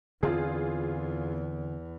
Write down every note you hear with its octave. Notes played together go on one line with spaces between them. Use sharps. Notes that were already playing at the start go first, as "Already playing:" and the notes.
E2 D3 C4 F4 G#4